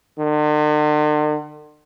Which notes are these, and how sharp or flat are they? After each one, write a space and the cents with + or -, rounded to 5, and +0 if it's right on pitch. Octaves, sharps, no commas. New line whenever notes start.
D3 +45